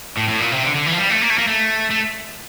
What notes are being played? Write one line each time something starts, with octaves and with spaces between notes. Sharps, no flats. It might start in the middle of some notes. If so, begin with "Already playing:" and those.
A2
A2
A#2
C3
D3
D3
E3
F3
G3
A3
A#3
A3
A#3
A3
A3